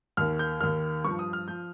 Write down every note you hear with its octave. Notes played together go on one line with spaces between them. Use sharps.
D#2 D#3 F6
G6
D#2 D#3 F6
G2 F3 C#6
D#6
F6
F3 G6